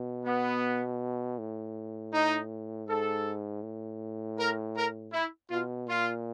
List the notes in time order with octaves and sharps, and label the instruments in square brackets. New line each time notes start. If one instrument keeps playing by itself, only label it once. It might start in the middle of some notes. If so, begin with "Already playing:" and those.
Already playing: [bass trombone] B2
[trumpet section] B3
[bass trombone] A2
[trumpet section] D#4
[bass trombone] G#2 [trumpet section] A4
[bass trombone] A2
[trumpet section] A#4
A#4
E4
[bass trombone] B2 [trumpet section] F4
[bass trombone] A#2 [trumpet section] F4